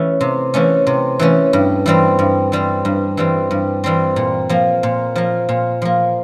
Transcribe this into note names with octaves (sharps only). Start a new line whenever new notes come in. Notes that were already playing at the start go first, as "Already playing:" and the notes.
Already playing: E3 A3 C#4
C3
E3 A3 C#4
C3
E3 A3 C#4
G2
E3 G3 C4
G2
E3 G3 C4
G2
E3 G3 C4
G2
E3 G3 C4
A#2
F3 A#3
A#2
F3 A#3
A#2
F3 A#3